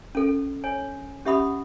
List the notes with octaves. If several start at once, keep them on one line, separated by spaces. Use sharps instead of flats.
C#4 A4
C#5 G#5
C#4 G4 E5 F#5 B5 D#6